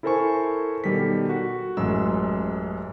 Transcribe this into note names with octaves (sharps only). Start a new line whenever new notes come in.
E4 A4 A#4 C5 G#5 C#6
B2 D#3 G3 G4 A4 B6
F#4
A1 F#2 G#3 E6